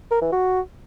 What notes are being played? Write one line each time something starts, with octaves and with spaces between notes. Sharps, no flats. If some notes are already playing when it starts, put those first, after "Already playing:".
A#4
E3
F#4